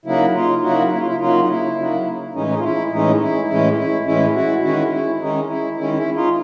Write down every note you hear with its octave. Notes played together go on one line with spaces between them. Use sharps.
C#3 F#3 A#3 D#4 E4
D#4 F4
C#3 F#3 A#3 D#4 E4 F#4
E4
F4
E4
C#3 F#3 A#3 D#4 F4
D#4
E4
C#3 F#3 A#3 D#4
A2 E3 G#3 C#4 D#4
D#4
F4
E4
A2 E3 G#3 C#4 D#4
E4
A2 E3 G#3 C#4 E4
E4
A2 E3 G#3 C#4 E4
E4 F#4
D#3 G#3 C#4 E4 F#4
E4
D#3 G#3 C#4 D#4
E4
D#3 G#3 C#4 E4
E4
D#4 F4